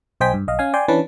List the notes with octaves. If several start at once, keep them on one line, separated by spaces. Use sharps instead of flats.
B1 C5 D#5 G5 G#5 B6
G2
B1 D#5 F5
C#4 F5 G#5
D5 G5 G#5 C6
E3 C#4 D4 B4 A5